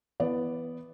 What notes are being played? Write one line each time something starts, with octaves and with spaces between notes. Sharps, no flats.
E3 B3 D5